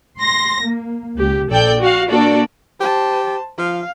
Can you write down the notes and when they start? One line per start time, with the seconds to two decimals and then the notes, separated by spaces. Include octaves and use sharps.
0.18 C6 A#6
0.62 A#3
1.17 C#2 G4
1.49 A#1 A4 D5 G5 G6
1.81 F#4 F5
2.09 A#3 D4 F#4 A4 D5
2.80 G4 C5 A5
3.59 F3 F5